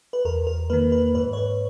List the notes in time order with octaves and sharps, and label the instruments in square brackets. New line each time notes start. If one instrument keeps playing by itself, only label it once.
[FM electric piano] B4
E2 A#4
A#4
D#3 A#3 B4
B4
G#2 B4
C#5
B4